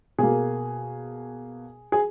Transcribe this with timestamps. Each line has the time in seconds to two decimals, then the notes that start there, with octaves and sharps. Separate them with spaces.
0.19 B2 A#3 G#4
1.92 G#4